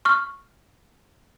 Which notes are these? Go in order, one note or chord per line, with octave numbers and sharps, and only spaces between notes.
C#6 F6